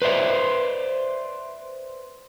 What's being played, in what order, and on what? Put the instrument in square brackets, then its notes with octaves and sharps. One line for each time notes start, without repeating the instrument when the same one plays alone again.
[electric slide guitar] B4 C5 D5 E5